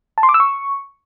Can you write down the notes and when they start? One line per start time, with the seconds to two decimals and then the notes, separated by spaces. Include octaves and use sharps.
0.18 A5
0.23 C6
0.29 D6
0.34 E6
0.40 C#6